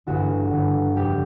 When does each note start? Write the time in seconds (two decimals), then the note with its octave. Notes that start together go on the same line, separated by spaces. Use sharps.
0.07 A1 G2 D3 F#4
0.52 A1 G2 D3
0.95 G1 F2 C#3 G4